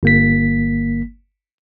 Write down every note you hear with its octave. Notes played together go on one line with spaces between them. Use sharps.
G1 A#3 B6